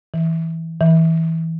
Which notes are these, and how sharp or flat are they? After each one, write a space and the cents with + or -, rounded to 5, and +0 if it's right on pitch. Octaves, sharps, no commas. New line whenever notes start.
E3 -15
E3 -20